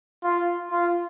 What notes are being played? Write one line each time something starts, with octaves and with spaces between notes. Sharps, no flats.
F4
F4